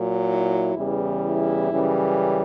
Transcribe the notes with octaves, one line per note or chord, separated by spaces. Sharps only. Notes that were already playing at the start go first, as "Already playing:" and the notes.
Already playing: A#2 F#3
E4
E2 C#3 E3 G3
E4
F#2 C#3 E3 G3